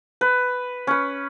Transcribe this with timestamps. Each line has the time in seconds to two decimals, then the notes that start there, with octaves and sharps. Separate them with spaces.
0.21 B4
0.87 C#4 B4